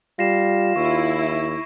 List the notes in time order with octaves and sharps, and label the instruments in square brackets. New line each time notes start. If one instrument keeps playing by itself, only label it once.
[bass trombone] G3 [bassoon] F4 [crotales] A#6 C7 E7
[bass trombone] D#2 [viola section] E4 [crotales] C#6